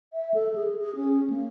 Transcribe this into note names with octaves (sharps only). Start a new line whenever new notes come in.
E5
A4
G#4
G#4
C#4
A#3